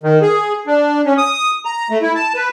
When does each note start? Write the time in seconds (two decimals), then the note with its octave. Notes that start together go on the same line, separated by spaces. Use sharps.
0.03 D#3
0.22 G#4
0.67 D4
1.05 C#4
1.18 D#6
1.65 A#5
1.90 A3
2.02 E4
2.15 A5
2.35 B4